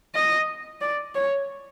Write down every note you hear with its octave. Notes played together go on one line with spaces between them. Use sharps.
D#5
D5
C#5